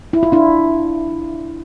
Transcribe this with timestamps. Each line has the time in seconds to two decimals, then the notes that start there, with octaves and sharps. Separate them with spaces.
0.13 E4
0.23 F4
0.32 D4 E4